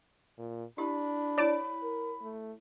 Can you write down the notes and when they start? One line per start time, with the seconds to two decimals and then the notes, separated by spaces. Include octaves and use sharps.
0.38 A#2
0.78 D4 E4 G4 B5
1.38 E4 C#5 D5 A5 D7
1.83 A#4
2.22 A3